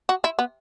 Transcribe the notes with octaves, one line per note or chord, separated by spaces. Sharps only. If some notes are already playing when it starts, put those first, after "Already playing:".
F#4
E4
B3